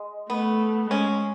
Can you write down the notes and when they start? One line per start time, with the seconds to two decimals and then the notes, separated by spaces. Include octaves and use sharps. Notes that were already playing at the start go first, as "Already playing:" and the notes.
Already playing: G#3
0.30 A3 B3
0.90 G#3 C#4